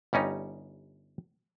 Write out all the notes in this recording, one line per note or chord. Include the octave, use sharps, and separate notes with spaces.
G1 G3 C#4 D#4